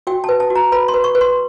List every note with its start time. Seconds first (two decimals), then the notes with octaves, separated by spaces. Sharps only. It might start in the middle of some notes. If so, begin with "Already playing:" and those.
0.07 F#4 G5
0.24 B4 A5
0.40 A5
0.50 F#4
0.55 A#5
0.72 B4 B5
0.88 C6
0.94 B4
1.04 C#6
1.15 B4
1.21 C6